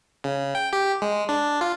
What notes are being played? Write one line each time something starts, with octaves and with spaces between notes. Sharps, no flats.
C#3
G5
G4
G#3
D4
F4